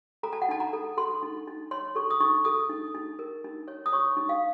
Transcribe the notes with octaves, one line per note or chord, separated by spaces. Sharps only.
A4 A#5
A5
F#5
D#4 A5
A#5
A4
A4 C6
D#4
D#4
C#5 C6
A4 C#6
D#6
D#4 C#6
A4 D#6
D#4
D#4
A#4
D#4
C#5
D#6
C#5 C#6
D#4
F5